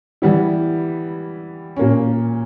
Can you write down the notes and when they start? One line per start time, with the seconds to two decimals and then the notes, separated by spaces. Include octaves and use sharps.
0.22 E3 G3 B3 E4
1.77 A#2 A#3 C#4